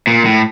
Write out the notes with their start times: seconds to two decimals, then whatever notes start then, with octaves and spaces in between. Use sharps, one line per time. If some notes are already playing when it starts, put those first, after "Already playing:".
0.07 A#2
0.25 A2